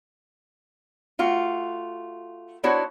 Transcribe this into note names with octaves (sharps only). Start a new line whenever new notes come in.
A3 F4 F#4
B3 D4 E4 F#4 C5 C#5